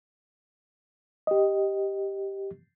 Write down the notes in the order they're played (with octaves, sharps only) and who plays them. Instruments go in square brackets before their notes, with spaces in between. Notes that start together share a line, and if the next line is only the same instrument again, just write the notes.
[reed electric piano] G4 D#5